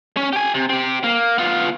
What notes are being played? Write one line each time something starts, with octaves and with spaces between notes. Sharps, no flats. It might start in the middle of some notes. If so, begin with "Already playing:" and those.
C#4
G4 G#5
C3
C4 G4
A#3
B3 F4